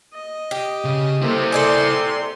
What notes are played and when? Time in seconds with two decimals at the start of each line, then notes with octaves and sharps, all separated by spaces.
0.14 D#5
0.51 G4
0.84 C#3
1.21 C3 A#3 E4 A4 C5
1.52 A4 D5 G#5 C6